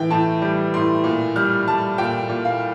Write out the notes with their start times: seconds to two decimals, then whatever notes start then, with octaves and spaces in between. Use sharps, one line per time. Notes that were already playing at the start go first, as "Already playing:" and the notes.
Already playing: A2 E3 G5
0.10 A2 A5
0.42 G3
0.74 A2 C6
1.04 A#2
1.36 G3 F6
1.67 G3 A5
1.98 A#2 G5
2.29 A#2
2.45 F5